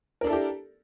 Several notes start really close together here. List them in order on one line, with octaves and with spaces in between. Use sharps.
A#4 D4 A4 E4 G4